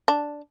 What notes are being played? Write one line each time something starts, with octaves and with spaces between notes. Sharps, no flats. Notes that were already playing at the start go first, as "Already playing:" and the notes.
D4